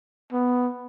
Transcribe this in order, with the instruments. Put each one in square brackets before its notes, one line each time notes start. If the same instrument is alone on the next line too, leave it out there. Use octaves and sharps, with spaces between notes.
[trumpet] B3